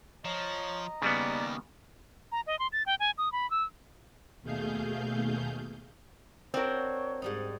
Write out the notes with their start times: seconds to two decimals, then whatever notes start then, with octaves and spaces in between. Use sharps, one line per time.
0.25 F3 C#5 D#5 A#5
1.02 D#2 C#3 G3 B3 D5
2.32 A#5
2.47 D#5
2.59 C6
2.73 A6
2.86 G5
3.00 G#5
3.18 D#6
3.32 B5
3.51 E6
4.42 D#2 B2 A3 G#4 F5 G6
6.54 C4 D4 F#4 A#4 C#5
7.22 G#2 G3 D#4